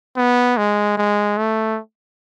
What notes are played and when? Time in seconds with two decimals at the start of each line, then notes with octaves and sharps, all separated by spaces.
0.17 B3
0.57 G#3
0.97 G#3
1.38 A3